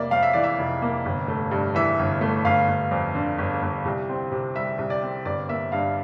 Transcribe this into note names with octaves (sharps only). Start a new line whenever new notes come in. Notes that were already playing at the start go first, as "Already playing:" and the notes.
Already playing: F1 A#3 D5 E5
F2 F5
E5
E3 D5
E5
F1
A#3
G1
A3
G2
E3 E5
G1
A3
G1 F5
G1
F2
D3
G1
G1
C2
C4
C3
G3 E5
C2
D5
C4
G1 D5
A#3 E5
G2 F5